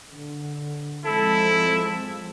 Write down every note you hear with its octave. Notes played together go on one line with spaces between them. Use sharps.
D3
F3 G#3 C4 E4 A4